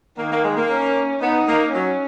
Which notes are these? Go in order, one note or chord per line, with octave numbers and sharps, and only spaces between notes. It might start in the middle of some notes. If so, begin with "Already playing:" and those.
D#3 A#3
A#3
G#3
A#3
C#4
B3 D#4
A#3
F#3 C#4